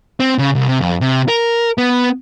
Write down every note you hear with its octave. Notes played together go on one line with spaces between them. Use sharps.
C4
C#3
C2
C3
F2
C3
A#4
B3